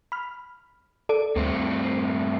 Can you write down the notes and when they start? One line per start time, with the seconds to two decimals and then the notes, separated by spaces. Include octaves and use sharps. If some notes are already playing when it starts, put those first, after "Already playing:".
0.12 B5 F6
1.09 A4 D5 D7
1.36 D2 G2 A3 C4